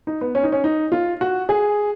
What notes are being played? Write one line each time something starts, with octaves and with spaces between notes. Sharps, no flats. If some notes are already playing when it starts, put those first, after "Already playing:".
D#4
B3
C#4
D#4
C#4
D#4
F4
F#4
G#4